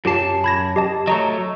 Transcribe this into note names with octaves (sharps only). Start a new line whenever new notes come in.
F#2 F4 G4 A5 C7
B5 G#6 A#6
G4 D#5 A5
F#3 A3 D#5 A#5 C#6